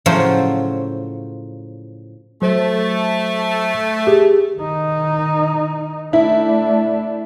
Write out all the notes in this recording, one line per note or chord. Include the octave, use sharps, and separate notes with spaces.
A2 C#3 F3 F#3 F4 C5
F#3 A3 C5
G4 G#4
D#3 D#4
A3 D4 E4